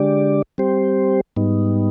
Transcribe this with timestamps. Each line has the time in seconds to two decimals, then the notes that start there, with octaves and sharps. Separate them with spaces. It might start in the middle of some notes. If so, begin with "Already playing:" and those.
Already playing: D3 G#3 D4 G4 D5
0.58 G3 C4 G4 C5
1.36 G#2 G3 B3 D#4